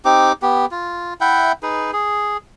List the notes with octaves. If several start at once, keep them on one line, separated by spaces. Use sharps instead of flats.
C4 D#4 G4 D6
B3 G4
F4
E4 E5 F#5 G5
D#4 G#4 B4
G#4